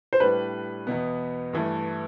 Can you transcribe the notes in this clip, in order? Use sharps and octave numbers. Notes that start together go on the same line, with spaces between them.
C5
A2 G3 D4 B4
E2 B2 B3
G2 E3 A3